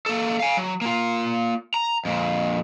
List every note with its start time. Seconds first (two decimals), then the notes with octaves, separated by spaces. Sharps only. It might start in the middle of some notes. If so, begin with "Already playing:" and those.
0.06 A#3 A4
0.40 F5 G#5
0.57 F#3
0.81 A#3 F4
1.74 A#5
2.05 F2 A#2